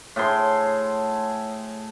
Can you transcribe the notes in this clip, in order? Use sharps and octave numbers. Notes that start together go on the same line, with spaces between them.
A2 G#4 C6